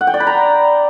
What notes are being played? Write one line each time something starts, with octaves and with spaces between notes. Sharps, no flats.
F#5
G5
D5
B5
A#5